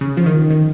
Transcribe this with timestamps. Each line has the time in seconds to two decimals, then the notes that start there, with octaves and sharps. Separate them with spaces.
0.01 C#3
0.17 F3
0.26 D#3
0.50 D#3